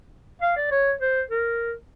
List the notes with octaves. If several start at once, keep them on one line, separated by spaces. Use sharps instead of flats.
F5
D5
C#5
C5
A#4